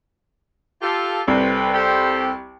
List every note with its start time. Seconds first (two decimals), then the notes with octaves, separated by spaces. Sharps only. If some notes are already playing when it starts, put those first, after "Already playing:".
0.82 F4 G4 A4
1.28 C2 C4 A4 B4
1.74 G4 A4 C5